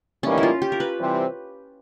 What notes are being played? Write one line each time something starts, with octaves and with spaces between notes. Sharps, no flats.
A2 E3 G3 A#3 C#4 D#4
E4
F4
G4
A#4
B4
C3 E3 G3 C4